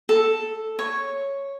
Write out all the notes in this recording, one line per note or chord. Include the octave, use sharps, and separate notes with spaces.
A4
C#5